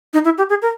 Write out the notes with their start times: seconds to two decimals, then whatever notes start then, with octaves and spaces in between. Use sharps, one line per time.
0.13 D#4
0.25 E4
0.38 G4
0.50 G#4
0.62 A#4